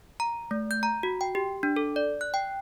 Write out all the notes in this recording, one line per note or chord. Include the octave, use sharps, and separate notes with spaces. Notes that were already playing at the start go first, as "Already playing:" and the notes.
A#5
A3
G6
A#5
F#4
G5
G4
D4
A4
D5
F#6
G5